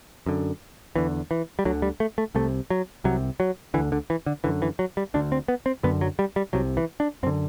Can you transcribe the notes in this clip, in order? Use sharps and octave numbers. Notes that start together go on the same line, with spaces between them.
F#2 D3
E2 D3 E3
E3
G3
D2 D3 F#3
G3
A3
A3
C2 C3 A3
F#3
C2 C3 F#3
F#3
D2 D3 E3
D3
E3
D3
F#2 D3 E3
E3
F#3
G3
D2 D3 D4
C4
B3
C4
F#2 D3 B3
F#3
G3
G3
C2 C3 F#3
E3
D4
F#2 D3 C4